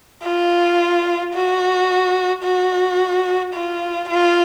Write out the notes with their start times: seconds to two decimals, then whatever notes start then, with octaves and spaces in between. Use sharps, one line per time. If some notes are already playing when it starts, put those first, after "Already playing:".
0.24 F4
1.34 F#4
2.43 F#4
3.54 F4
4.09 F4